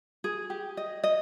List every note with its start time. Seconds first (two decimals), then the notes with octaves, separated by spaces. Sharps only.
0.24 G#4
0.50 G4
0.77 D#5
1.04 D#5